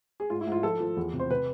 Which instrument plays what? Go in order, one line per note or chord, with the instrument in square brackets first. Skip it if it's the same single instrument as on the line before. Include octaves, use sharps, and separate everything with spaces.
[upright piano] G#4
G#2 F4
E4
G#2 F4
F3 A4
F3
E2
C3
C5
C3 B4